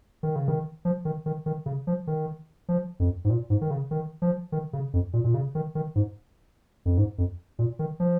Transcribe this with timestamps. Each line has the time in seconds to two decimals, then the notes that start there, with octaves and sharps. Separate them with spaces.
0.23 D#3
0.36 C#3
0.48 D#3
0.85 F3
1.05 D#3
1.26 D#3
1.46 D#3
1.66 C#3
1.87 F3
2.07 D#3
2.69 F3
3.00 F2
3.25 G#2
3.30 A#2
3.50 G#2
3.61 D#3
3.71 C#3
3.91 D#3
4.22 F3
4.52 D#3
4.73 C#3
4.93 F2
5.13 A#2
5.24 A#2
5.34 C#3
5.55 D#3
5.75 D#3
5.95 G#2
6.85 F2
6.98 G#2
7.18 F2
7.59 A#2
7.79 D#3
8.00 F3